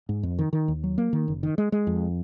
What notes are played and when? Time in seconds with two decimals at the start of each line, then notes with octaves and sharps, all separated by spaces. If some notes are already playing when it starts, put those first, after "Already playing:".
0.09 G#2
0.23 F2
0.39 D#3
0.53 D#3
0.68 D#2
0.84 F#3
0.98 A#3
1.13 D#3
1.28 F#1
1.43 D#3
1.58 G#3
1.72 G#3
1.87 F2